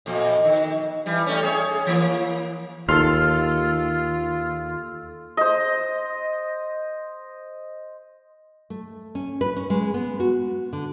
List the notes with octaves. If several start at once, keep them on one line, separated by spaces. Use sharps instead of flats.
F2 A#2
D#3
E3 G3
G3 A3 C#4
G#4 C#5
E3 A#3
D#2 F4 A4 C6 F6
C5 D#5
A3
C#4
B4
C#4
G#3
B3
F#4
D3